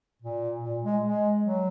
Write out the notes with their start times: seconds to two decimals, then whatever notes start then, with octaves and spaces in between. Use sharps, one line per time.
0.22 A#2
0.63 A#2
0.83 G#3
1.03 G#3
1.44 F#3